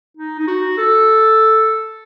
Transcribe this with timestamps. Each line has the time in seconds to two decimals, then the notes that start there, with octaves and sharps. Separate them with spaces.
0.17 D#4
0.39 D#4
0.47 F#4
0.77 A4